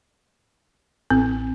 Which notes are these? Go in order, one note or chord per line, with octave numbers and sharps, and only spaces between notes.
A1 C4